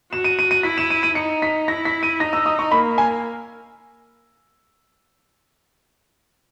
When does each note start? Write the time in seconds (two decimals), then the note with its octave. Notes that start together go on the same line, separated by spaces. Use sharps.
0.12 F#4 E7
0.24 D#7
0.39 D#7
0.51 D#7
0.63 E4 B6
0.78 E7
0.90 D#7
1.03 D#7
1.15 D#4 C#7
1.42 B6
1.68 E4 A#6
1.85 B6
2.03 D#7
2.20 D#4 A#6
2.33 E6
2.46 D#6
2.59 C#6
2.71 A#3 B5
2.98 G#5